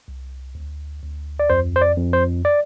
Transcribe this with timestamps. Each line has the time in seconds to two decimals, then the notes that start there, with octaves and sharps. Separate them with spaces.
0.08 C2
0.55 D2
1.02 D2
1.39 D5
1.50 F2 C5
1.76 C5
1.82 D5
1.97 F2
2.13 C5
2.45 D5